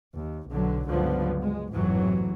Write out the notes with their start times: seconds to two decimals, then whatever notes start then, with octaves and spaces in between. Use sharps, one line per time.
0.15 D#2
0.49 B1 D3 F#3
0.88 C#2 G2 D3 F3 F#3 B3
1.41 G#3
1.71 A1 F2 G#2 C3 E3 F#3